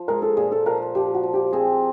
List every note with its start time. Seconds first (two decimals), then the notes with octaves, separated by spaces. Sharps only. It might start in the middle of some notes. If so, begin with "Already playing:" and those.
Already playing: F3
0.08 G#3 A#4
0.22 A4
0.37 A#2 G#4
0.52 A4
0.66 F3 A#4
0.95 F3 G4
1.15 F#4
1.23 F3
1.34 G4
1.53 C4 G#4